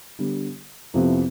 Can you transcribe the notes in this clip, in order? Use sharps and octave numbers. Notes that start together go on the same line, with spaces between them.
D3 G3 B3
F2 C3 F3 B3 E4